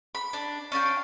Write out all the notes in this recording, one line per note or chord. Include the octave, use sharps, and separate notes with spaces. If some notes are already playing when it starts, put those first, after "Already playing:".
B5
D4
C#4 D4 F5 G5